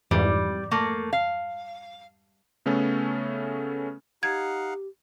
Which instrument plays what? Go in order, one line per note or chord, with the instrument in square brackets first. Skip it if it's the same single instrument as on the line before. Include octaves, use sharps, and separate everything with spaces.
[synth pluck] F2 G#2 E3 [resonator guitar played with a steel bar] G3
[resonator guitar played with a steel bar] A3 A#3
F5
[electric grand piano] C#3 A3 B3 C#4 A4
[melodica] D#4 F5 F#5 [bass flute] G4 [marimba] G#6